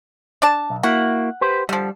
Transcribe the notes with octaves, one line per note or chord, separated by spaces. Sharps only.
D4 D5 A5
B1
A#3 E4 F#4 F#5
G4 B4 C5
D3 F3 G3